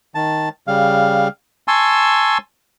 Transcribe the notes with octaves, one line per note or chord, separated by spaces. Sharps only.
D#3 A5
C#3 G3 F5
G#5 A5 C6 C#6 E6